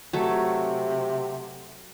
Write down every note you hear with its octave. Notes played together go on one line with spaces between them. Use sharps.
C3 F#3 A3